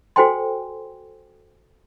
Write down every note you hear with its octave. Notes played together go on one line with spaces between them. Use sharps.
F#4 A4 C5 G5 G#5 C6